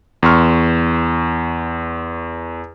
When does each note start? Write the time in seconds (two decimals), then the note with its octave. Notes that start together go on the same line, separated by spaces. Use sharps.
0.23 E2 C6 C#6 F6